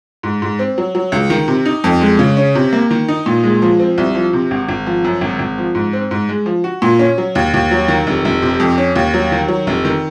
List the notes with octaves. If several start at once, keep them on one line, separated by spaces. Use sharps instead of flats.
G#2
G#2
C4
F#3
F#3
C#2
D#3
C3
D#4
F2
G#3
C#3
C#4
C3
A#3
D#3
D#4
A#2
G#3
F3
C4
C2
F3
C3
G#1
G#1
F3
F#2
G#1
G#1
F3
G#2
C4
G#2
G#3
F3
F#4
A#2
C#4
F#3
D#2
D#2
F#3
D#3
F1
F1
C3
F2
C#4
D#2
F#3
D#3
F#3
F1
D#3